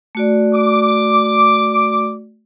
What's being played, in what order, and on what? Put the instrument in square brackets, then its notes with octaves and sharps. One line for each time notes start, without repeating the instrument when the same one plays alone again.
[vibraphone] A3 F#4 D5
[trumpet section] D6